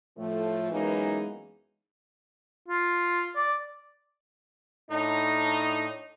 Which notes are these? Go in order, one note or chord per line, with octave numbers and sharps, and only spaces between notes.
A2 F3 A3
F#2 E3 G#3 A#3 B3 D#4
F4
D5
A2 D4 D#4